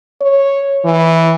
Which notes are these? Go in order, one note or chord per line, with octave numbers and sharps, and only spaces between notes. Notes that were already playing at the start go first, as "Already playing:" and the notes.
C#5
E3